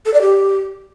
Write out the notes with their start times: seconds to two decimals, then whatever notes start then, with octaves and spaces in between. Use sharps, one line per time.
0.06 A4
0.14 D5
0.22 G4